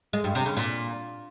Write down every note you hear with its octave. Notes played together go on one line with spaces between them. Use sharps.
G#3
G2
C3
C#3
A#2